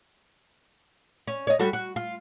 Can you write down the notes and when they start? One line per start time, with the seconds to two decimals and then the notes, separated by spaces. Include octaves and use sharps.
1.27 C#4
1.47 C#5 D#5
1.59 G3 F#4 A4
1.73 F#4
1.96 F4